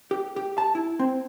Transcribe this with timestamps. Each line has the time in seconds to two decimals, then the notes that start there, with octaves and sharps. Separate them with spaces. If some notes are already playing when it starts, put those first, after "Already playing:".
0.11 G4
0.36 G4
0.58 A5
0.75 E4
0.99 C4